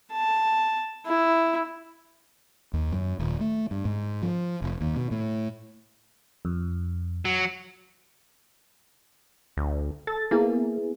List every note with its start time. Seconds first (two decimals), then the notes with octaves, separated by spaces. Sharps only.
0.12 A5
1.06 E4
2.74 D#2
2.92 F#2
3.19 D#1
3.40 A3
3.71 G2
3.85 G#2
4.23 F3
4.62 F1
4.81 D#2
4.96 B2
5.11 A2
6.45 F2
7.25 F#3
9.57 D2
10.07 A4 A6
10.31 A#3 B3 E4 G#4